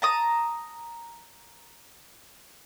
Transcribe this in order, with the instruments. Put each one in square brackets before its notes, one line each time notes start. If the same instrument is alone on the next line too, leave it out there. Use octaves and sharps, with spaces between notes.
[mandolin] A5 A#5 D#6